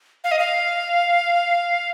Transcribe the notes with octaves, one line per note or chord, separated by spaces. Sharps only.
F5
D#5
F5